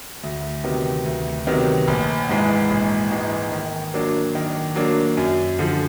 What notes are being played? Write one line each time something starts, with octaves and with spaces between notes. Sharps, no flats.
D2
C3 D#3 F#3 B3
D2
C3 D#3 F#3 B3
A#1
G#2 E3 G#3
A#1
G#2 E3 G#3
D#3
F#3 A#3 D4
D#3
F#3 A#3 D4
F#2
D3 F3